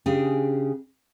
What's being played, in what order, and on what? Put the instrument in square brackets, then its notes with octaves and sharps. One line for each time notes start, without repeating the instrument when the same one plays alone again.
[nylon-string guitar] C#3 D4 G4 G#4